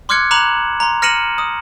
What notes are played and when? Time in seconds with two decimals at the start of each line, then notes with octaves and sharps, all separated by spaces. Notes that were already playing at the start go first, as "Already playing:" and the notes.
0.09 C6 D6 F6 F#6 G#6 C#7
0.31 A#5 B5 D6 F#6 E7 F#7
0.80 A#5 C6
1.02 F6 A#6 C#7 D#7 E7 F#7
1.38 D#6